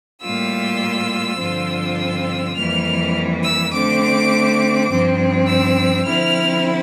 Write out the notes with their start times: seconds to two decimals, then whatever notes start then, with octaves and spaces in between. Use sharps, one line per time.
0.22 A2 G3 A#3 F4 E6
1.39 G2 D3 F3 C4 F4
1.98 E6
2.56 F2 E3 G3 A#3 F6
3.43 E6
3.73 D3 A3 C4 D6
4.90 G2 F3 C4
5.48 E6
6.06 D3 F3 C4 E4 F6